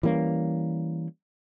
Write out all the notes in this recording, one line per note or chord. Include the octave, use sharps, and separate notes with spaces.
E3 G3 A#3 C#4